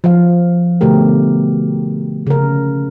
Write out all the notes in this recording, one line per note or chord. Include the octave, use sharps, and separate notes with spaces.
F3 F5
B2 D3 A3 G4 A#4
C#3 A#4